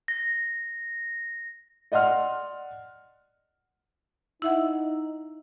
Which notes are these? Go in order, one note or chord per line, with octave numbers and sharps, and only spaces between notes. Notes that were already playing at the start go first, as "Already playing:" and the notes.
A#6
D5 D#5 F#5 C6 F6
D#4 E4 E5 F#5